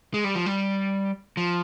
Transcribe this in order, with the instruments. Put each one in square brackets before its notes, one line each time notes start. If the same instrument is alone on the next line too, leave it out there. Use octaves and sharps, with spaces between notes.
[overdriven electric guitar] G#3
G3
F3
G3
F3